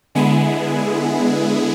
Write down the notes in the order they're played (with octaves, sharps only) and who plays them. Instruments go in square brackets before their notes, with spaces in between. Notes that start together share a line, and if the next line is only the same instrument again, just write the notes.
[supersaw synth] D3 G#3 B3 E4 G#4